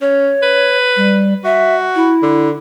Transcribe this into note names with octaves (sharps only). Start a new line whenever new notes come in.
C#4 C#5
B4
G3
F#4 E5
E4
D3